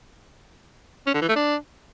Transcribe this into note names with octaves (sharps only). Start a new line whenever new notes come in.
C#4
D3
E3
A3
D4